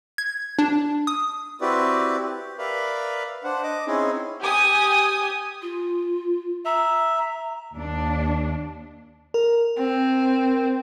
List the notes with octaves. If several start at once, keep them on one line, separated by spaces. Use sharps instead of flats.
G#6
D4
D#6
C4 E4 F#4 G4 B4 D5
G4
A#4 B4 D5 E5 F5 B5
D4 C5 F#5
D#5 D6
C4 C#4 D#4 E4 G#4
G4 G#5 D#6
F4
E5 A#5
D#2 D4
A#4
C4